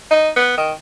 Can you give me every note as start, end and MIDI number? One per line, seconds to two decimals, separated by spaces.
0.11 0.29 63
0.36 0.55 59
0.58 0.72 51